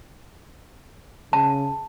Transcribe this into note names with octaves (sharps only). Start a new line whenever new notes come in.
C#3 A5